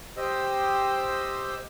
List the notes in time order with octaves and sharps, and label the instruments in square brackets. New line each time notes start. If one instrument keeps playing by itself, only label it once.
[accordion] G4 C5 D#5 E6